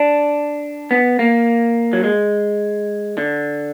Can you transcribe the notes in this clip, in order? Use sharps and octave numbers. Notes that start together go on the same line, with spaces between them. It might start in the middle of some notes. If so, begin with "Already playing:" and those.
Already playing: D4
B3
A#3
F#3
G#3
D3